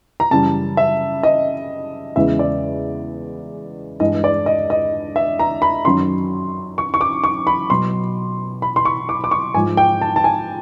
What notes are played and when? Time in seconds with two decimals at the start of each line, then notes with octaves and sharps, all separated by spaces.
0.20 A#5
0.31 F#2 C#3 E3 G3 A5
0.77 E5
1.23 D#5
2.16 E2 C#3 E3 G#3 E5
2.39 D5
4.00 G2 E3 G#3 D#5
4.24 D5
4.46 D#5
4.70 D#5
5.16 E5
5.39 A#5
5.62 B5
5.85 F#2 D#3 F#3 C6
6.78 C#6
6.94 C#6
7.01 D6
7.24 C#6
7.47 B5
7.70 B2 F#3 C6
8.62 B5
8.76 C6
8.85 C#6
9.09 D6
9.24 D6
9.31 C#6
9.54 G#2 G#5
9.57 F3 G#3
9.77 G5
10.01 A5
10.16 A5
10.24 G#5